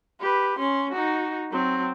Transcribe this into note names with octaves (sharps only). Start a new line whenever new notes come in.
G4 B4
C#4 C6
D#4 F#4
F#3 C4